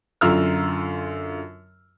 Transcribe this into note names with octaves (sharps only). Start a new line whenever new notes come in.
F#2 D3 F4 A#5 E6 F6